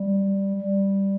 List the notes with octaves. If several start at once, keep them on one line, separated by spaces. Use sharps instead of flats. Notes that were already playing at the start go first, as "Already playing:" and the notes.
Already playing: G3
G3